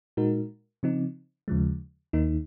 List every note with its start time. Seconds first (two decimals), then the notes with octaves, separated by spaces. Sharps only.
0.17 A#2 G#3 D#4 F#4 A#4
0.83 C#3 F3 C4 D#4
1.48 D#2 C#3 F3 G#3
2.13 D#2 D#3 A#3 D#4